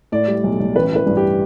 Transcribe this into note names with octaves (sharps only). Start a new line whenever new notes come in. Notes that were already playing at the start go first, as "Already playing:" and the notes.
A2 D5
G3
B1
B1
A1 B4
E3 B4
G2
G4